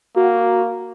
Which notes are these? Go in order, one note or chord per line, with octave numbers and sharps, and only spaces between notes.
A#3 F#4